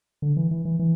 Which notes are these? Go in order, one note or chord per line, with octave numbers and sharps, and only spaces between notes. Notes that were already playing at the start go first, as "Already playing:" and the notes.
D3
E3
E3
E3
E3